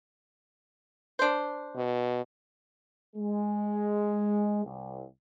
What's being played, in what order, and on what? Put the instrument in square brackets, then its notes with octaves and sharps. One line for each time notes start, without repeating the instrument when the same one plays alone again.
[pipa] D4 C5
[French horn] B2
[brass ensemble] G#3
C2